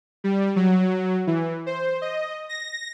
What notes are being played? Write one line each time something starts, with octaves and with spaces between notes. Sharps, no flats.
G3
F#3
E3
C5
D#5
A#6